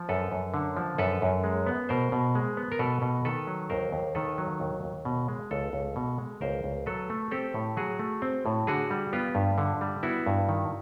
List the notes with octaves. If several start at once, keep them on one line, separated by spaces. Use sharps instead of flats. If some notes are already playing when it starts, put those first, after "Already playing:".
Already playing: F3
F#2 A4 B4
F#2
D3
F3
F#2 A4 B4
F#2
G#3
B3
B2 A#4 C5
B2
G#3
B3
A#4
B2 A4 B4
B2
D#3 A4 B4
F#3
D#2 A#4 C5
D#2
D#3 A4 B4
F#3
D#2
D#2
B2
G#3
C#2 A4 B4
C#2
B2
G#3
C#2 A#4 C5
C#2
F#3 A4 B4
A3
C4 G4 A4
A2
F#3 F#4 G#4
A3
C4
A2
D3 F#4 G#4
G3
B3 F4 G4
G2
D3
G3
B3 E4 F#4
G2
D#3